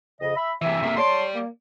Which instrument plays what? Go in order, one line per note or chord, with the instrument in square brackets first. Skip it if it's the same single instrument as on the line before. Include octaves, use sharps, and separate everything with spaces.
[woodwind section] F2 C#3 D#5
E5 B5
[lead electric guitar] C3 E3 [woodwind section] E5
[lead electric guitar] C3 A#3
[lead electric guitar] G3 D5 [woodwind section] C#5 A5 C6
[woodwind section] A#3